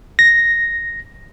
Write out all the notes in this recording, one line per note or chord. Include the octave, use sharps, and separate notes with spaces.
A#6